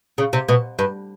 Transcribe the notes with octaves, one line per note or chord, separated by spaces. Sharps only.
C#3
C3
B2
G2